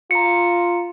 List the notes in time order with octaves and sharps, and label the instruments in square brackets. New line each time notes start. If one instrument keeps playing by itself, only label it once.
[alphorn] F4 [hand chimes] A#5 C#7